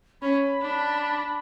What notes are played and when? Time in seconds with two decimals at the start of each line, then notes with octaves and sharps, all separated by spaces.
0.22 C#4 B5
0.61 D4